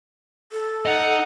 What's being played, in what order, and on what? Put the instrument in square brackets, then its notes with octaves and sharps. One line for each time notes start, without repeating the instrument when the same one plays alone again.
[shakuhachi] A4
[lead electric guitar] D#4 D#5 [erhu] F#5